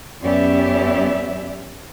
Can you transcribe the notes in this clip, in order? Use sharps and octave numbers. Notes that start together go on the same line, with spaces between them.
F#2 B3 C#4 G4 D5 E5